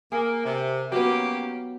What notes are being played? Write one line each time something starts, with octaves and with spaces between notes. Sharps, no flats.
A#3 G#4 A#4
C3
F#3 A#3 B3 C#4 G4